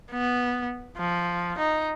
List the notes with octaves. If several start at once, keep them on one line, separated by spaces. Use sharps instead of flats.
B3
F3
D#4